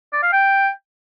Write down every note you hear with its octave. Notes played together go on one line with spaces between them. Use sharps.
D5
F5
G5